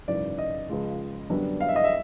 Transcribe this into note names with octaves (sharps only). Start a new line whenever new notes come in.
G#1 F#2 C#3 E3 D5
D#5
C#2 C#3 F3 G#3
F#2 D3 G3 B3 D4
F5
E5
D#5
E5